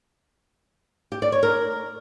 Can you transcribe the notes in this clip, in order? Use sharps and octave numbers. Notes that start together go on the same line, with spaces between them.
G4
D5
C#5
A#4